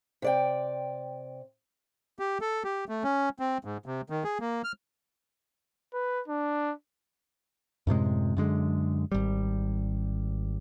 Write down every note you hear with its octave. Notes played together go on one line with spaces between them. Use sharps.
C3 D5 G5
G4
A4
G4
A3
C#4
C4
G#2
C3
D#3
G#4
A#3
F6
B4
D4
F#2 A2 C3 G#3
F#2 D3 G#3
G#1 G3